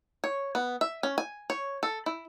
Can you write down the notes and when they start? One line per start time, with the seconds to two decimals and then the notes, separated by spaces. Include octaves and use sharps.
0.24 C#5
0.55 B3
0.81 E5
1.03 C#4
1.18 G#5
1.50 C#5
1.83 A4
2.06 E4